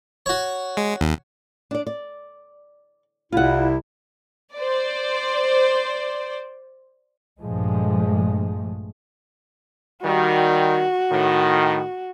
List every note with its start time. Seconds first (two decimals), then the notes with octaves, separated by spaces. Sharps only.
0.26 F#4 C#5
0.77 G#3
1.01 D#2
1.71 D4 D5
1.87 D5
3.32 C2 C3 E4 F4 F#5
4.55 C5 D5
7.40 A#1 G2 F3 G#3 A3
10.04 D#3 G3 F#4
11.11 A2 D#3